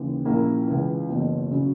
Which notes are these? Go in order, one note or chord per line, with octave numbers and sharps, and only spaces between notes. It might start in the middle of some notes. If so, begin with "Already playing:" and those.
Already playing: D#2 C#3 E3
A#1 A#2 A#3 C#4 E4
C#2 C#3 E3
F#1 E2 B2
C#3 F#3 C#4